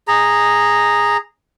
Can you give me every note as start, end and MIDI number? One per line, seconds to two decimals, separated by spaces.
0.08 1.17 68
0.08 1.17 82